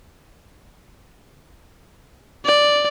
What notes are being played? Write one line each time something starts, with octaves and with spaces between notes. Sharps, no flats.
D5